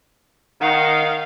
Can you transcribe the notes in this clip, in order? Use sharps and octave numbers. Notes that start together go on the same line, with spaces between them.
D#3 F5 F#5